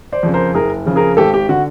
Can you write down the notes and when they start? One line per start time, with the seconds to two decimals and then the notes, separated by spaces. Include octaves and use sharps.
0.12 C5 D5
0.23 F2 C#3
0.34 A#4 C5
0.54 F#1 G#4 A#4
0.86 F2 C#3
0.96 G#4 A#4
1.17 G#1 G4 A4
1.34 G4
1.49 D3 F#4